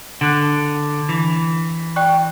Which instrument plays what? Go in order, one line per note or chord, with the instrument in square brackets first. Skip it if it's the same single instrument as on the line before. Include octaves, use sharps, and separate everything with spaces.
[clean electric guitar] D3 [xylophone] F#5 A5 D6 F#6
[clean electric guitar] E3
[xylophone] D5 G5 C#6 F#6